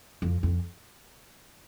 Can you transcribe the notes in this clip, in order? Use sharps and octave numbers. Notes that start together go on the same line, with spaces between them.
F2
F2